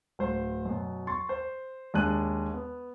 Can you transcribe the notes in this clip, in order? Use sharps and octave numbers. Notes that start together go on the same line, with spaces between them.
D1 C5 C6
F#2 B2
C6 C#6 A6
C5
D#2 G#3 D4 A5 F#6 D#7
B3